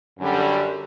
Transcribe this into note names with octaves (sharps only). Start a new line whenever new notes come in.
F#2 D3 G3